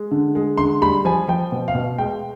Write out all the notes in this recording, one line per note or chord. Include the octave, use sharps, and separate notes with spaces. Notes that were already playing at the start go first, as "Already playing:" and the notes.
Already playing: G#3
D3
G#3
D3 C6
G3 B5
F3 G#5
F3 G5
B2
F5
B2
G#3 G5